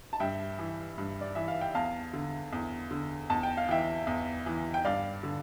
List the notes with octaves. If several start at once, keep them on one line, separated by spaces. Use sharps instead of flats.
A5
G2 E5 G5
E3
G2
D5
E3 E5
F5
G5
E2 F5 A5
D3
E2
D3
E2 A5
G5
F5
E3 E5 G5
E2
E3
G5
G2 D5 F5
D3